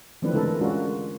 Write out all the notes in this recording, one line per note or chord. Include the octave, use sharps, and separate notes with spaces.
E3 F3 A3 C4 D4 B4
D3 G#3 E4 A4 A#4
G#3 C#4 D4 F4 F#4 A#4